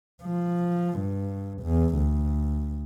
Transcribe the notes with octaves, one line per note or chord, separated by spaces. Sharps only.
F3
G2
E2
D2